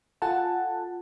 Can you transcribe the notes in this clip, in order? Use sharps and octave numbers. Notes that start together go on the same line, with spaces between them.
F4 A4 F#5 G#5 A5